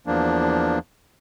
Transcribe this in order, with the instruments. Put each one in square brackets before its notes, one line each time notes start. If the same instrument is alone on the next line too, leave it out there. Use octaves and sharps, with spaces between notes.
[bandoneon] E2 F3 A#3 D4